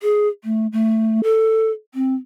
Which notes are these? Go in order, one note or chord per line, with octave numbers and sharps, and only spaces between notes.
G#4
A3
A3
A4
C4